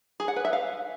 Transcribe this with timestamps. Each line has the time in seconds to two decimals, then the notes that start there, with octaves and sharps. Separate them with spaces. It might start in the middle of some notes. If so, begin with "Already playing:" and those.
0.20 G#4
0.28 F#5
0.36 B4
0.45 E5
0.53 F5